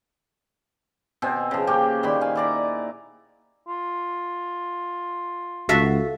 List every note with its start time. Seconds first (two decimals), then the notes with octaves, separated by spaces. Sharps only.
1.22 B2 C4 G#5
1.51 C#3 F3
1.67 A#3 G4 C#5 G5
2.03 A#2 D#3 B5 C6
2.21 F5 G#5
2.35 E4 D5 A#5
3.68 F4
5.69 C#2 F#4 A4 E5 F5